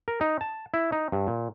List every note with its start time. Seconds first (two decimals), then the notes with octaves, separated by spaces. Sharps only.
0.08 A#4
0.21 D#4
0.41 A5
0.74 E4
0.92 D#4
1.12 G2
1.27 A#2